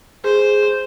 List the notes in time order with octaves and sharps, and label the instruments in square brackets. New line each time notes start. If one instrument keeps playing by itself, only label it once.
[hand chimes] G#4 [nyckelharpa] C5